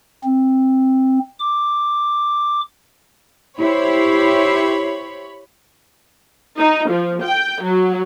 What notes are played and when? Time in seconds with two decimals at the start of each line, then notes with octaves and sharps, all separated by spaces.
0.24 C4
1.39 D6
3.58 E4 G4 C5 C#5 B5
6.58 D#4
6.89 F3
7.24 G5
7.62 F#3